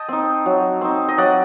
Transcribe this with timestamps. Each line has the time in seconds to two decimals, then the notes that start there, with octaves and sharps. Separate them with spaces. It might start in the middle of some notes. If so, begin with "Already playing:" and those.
Already playing: D#5 G5 A5
0.08 C4 D#4
0.46 F#3
0.81 C4 D#4
1.09 D#5
1.18 F#3 D5 F#5